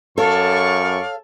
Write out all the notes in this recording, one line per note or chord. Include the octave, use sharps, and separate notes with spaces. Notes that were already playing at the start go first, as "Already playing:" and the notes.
F#2 A4 C#5 D5 F5 C#6